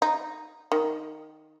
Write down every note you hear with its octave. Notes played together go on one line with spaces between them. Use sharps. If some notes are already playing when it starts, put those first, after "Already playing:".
D#4
D#3